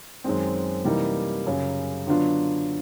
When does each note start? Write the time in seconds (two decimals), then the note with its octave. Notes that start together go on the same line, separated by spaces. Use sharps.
0.24 F#2 D#3 G#3 C4
0.85 C3 E3 G3 A#3 D#4
1.46 F#2 C#3 F#3
2.07 D3 F#3 B3 D4 F4